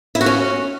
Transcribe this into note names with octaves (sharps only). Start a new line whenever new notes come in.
E4
F#4
C#4